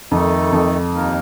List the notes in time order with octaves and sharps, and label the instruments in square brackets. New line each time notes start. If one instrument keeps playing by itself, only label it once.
[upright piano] F2 [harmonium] D#3 A3 D#4 A4
[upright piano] F2
[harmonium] D#2 D#3 A#3 D#4 A#4